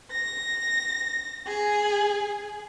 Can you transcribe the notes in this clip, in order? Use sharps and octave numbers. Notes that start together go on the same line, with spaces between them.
A#6
G#4